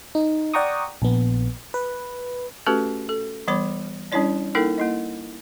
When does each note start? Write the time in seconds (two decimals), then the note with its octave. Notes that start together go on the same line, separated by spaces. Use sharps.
0.15 D#4
0.54 D5 F#5 G5 A#5 C#6 D#6
1.02 A#1 B3
1.74 B4
2.66 A3 C#4 F#4 G4 A4 B4
3.09 A4
3.47 E3 G3 B3 C#5 B5 D6
4.12 G3 C#4 D4 E4 C#5 D5
4.55 A#3 D#4 E4 A4 A#4 G5
4.78 A#3 E4 D#5